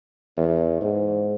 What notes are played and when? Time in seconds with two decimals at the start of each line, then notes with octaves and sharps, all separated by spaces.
0.37 E2
0.81 G#2